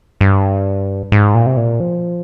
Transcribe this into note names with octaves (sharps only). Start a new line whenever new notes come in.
G2
G#2
A#2
C3
A#2
F3